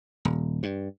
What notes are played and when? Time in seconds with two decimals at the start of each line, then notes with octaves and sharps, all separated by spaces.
0.25 D#1
0.63 G2